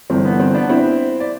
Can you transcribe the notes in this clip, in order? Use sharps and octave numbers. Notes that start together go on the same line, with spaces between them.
G1 G2 E3 C4
B3
C4
B3 D4
C4 E4
D5